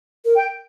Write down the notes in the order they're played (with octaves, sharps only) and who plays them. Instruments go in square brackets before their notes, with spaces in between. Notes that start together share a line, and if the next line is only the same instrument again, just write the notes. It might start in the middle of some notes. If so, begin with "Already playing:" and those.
[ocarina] A#4
[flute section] G5